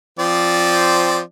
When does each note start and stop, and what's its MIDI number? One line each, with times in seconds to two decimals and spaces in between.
0.19 1.20 53
0.19 1.20 60
0.19 1.20 74